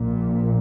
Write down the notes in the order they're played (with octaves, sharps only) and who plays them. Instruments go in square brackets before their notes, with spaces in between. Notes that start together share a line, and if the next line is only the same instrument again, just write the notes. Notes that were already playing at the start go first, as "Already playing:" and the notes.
Already playing: [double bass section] A#1 A#2